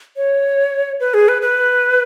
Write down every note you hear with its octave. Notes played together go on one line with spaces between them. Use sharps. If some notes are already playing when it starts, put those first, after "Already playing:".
C#5
B4
G#4
B4
B4